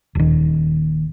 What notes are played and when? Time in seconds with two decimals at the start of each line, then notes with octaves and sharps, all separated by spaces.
0.15 D#1 D#2